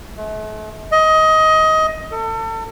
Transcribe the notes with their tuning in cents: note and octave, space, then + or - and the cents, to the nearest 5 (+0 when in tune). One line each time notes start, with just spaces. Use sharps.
A3 -45
D#5 +20
A4 +35